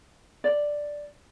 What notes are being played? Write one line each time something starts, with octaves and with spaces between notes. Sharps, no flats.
D5